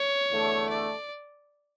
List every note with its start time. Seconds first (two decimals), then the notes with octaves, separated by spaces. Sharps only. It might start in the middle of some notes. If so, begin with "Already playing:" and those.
Already playing: C#5
0.31 E2 D3 A3 D4 A4
0.69 D5